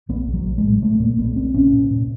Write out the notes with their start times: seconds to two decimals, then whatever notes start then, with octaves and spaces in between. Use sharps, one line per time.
0.09 A#1 B3
0.27 A#1
0.34 F#3
0.46 A#1
0.58 G#3
0.64 A2
0.82 A#2 A3
1.00 A#2 A#3
1.18 A#1 B3
1.36 A#1 C4
1.54 A#2 C#4
1.73 A#2
1.91 A#2